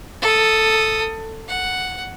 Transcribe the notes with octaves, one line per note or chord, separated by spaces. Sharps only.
A4 D#6
F#5